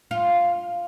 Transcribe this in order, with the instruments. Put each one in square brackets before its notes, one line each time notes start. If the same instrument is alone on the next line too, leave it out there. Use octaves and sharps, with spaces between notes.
[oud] F4